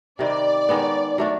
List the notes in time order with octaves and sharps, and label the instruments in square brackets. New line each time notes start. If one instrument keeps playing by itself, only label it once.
[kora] C3 D#3 G3 C4 [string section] D5
[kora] D#3 G#3 B3
F#3 A3 D4